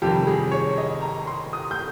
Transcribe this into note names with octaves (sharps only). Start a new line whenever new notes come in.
F2 C3 D#3 G3 G4
G#4
C#5
D#5
A#5
C6
D#6
G6